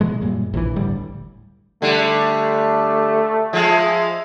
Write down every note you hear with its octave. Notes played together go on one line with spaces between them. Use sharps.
B2 E3 G#3
F#2 A#2 G3
A#1 D#2 D3 E3
G1 D2 A2 G3
D3 G3 A3
F3 G#3 E5